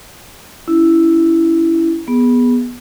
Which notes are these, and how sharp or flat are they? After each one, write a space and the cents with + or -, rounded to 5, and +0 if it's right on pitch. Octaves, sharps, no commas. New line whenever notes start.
C#4 +25 E4 +5
B3 -15 G#4 -5